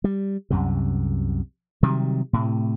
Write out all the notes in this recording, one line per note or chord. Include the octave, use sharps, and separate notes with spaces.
G3
C2 F#2 C3
C3 D#3 F#3 G3
A2 C3